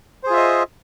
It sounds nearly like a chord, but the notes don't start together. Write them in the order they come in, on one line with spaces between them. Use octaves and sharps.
C5 G#4 F4 E5 D#5